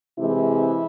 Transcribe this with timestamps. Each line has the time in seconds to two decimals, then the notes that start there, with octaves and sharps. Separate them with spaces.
0.18 C3 E3 G#3 E4